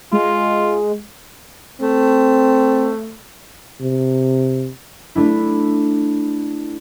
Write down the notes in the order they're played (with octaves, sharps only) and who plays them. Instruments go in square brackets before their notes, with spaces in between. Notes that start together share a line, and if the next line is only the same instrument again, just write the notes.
[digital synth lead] G#3 [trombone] F4
[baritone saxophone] A3 [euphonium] C4
[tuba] C3
[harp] A3 D4 E4